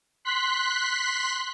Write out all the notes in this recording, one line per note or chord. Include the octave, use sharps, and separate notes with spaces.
C6 F#6 B6